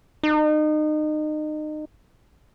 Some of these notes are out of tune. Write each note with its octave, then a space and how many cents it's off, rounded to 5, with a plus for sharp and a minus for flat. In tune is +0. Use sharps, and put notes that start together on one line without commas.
D#4 -30